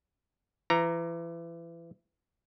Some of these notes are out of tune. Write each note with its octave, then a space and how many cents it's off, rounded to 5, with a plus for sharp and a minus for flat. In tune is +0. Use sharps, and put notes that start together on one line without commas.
E3 +30 A#5 +0